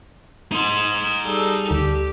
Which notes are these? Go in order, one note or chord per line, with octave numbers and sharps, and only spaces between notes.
D#4 C6
G3 G#4 A4
D2 G4